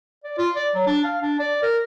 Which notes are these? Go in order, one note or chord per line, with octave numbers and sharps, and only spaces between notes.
D5
F4
D5
F#3
D4
F5
D4
D5
A#4